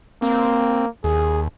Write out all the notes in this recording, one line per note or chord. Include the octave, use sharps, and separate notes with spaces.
A#3 C4
D#2 G#4